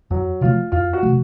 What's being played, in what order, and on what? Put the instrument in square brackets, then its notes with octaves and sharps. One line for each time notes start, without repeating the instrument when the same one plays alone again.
[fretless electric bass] F2 [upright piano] F#3
[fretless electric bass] C3 F3 A3 [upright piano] F4
[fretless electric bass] F2 [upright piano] F4
[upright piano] F#4
[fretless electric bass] C3 F3 A3